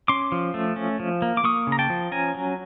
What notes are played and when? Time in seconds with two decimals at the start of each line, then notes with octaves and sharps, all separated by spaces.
0.08 C#4 C6 D6
0.32 F3
0.54 A3
0.76 C#4
1.00 F3
1.22 A#3
1.37 D6
1.44 A#3 C#6 D#6
1.67 C#3
1.72 A#5
1.79 G5 A5
1.90 F3
2.12 C#4 G#5 A#5
2.35 F#3